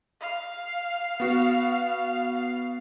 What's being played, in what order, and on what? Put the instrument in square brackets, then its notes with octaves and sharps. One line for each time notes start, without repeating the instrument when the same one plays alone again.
[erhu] F5
[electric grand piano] B3 F#4
[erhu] F5